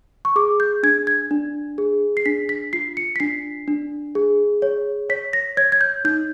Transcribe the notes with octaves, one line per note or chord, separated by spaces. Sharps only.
C#6
G#4 D6
G6
D4 G#6
G#6
D4
G#4
C7
D4 B6
B6
F4 C7
C#7
B6
D4 C7
D4
G#4
C#5
C#5 B6
A#6
C#5 G#6
G#6
G6
D#4 G6